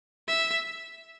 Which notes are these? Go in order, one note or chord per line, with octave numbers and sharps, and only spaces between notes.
E5